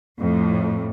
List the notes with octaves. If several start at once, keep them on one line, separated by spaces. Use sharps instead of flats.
F2 A2